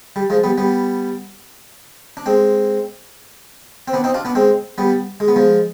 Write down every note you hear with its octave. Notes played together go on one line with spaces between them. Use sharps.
G3
F3 G#3
G3 B3
G3 B3
D4
G#3 C4
C4
B3 D4
C4 D#4
D4 F4
B3 D4
G#3 C4
G3 B3
G#3
B3
F3 G#3